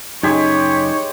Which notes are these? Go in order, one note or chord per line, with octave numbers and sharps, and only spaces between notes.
F#2 C#3 G#3 D#4 G4 C#5 G#5